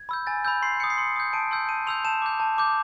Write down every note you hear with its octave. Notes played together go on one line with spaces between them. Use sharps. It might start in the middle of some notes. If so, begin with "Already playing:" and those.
Already playing: G#6
B5 E6 G6
G#5 A6
B5 E6 G6
C6 C7
D#6 G6 C#7
C7
C6 C#7
D#6 G6
A5 D7
C6 E6 G6
A5 D#7
C6 E6 G6 F7
A5 E7
D6 G6
A5
D6 G6